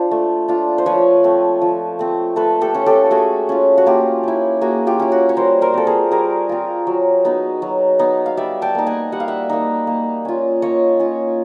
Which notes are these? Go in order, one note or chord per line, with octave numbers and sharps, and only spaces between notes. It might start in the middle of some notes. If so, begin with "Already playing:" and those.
Already playing: D4 F4 C5
A3
D4 F4
C5
F3 B4 C#5
A3 C4
F3
A3 C4
A3 A4 B4
G4 A4
C#4 F4
G4 A4
A3 F#4 G#4
C#4 F4
F#4
A#3 F4 G4
C#4 E4
A#3 F#4 G#4
F4 G4
C#4 E4
F#4
C#5
G3 A#4 C5
A#4 C5
C4 F4 A4
G#4 A#4
G3 G#4 A#4
C4 F4
F#3
B3 D#4
F#3
B3 D#4
F5
G3 D5 E5
G5 A5
A#3 D#4
F#5 G#5
G3 F#5
F5
E5 F#5
A#3 D#4
A#3
C#4 F4
A#3 C#5 D#5
C#4 F4